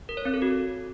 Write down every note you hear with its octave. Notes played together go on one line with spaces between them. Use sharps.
A#4
C#5
C4
A4
F#4